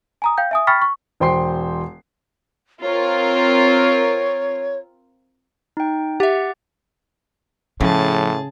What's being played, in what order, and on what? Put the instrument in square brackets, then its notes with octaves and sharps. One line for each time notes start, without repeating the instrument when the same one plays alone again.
[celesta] G#5 A#5 D#6
F5 G5 G6
E5 G#5 D#6
G5 B5 C#6 F6 A6 B6
C#6
[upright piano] E1 C5 G5 C6 C7
[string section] C4 F4 A#4 [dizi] C#5
[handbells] D#4 G5
[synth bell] G4 E5 [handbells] F#5 D6 A6
[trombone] A2 [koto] C#3 [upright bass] F3 [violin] G#4 A5